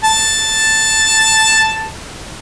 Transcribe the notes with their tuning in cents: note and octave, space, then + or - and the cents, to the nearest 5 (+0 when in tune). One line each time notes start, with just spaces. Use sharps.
A5 +0